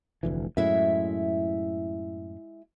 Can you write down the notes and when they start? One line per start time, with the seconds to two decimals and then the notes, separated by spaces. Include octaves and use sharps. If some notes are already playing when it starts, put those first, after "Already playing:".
0.23 F1 D2 E3
0.57 F#2 A2 G#3 E4 E5